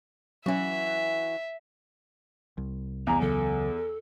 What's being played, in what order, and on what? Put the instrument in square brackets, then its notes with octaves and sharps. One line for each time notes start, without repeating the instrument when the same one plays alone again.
[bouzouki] E3 F#4 [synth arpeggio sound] F#3 C#4 [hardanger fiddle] E5
[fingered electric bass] C2
[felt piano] E2 [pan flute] A#5
[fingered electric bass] C#2 C#3 F#3 [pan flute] A4